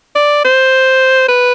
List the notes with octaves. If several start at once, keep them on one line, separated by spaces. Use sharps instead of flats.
D5
C5
B4